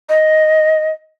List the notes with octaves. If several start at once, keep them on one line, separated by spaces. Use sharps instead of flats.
D#5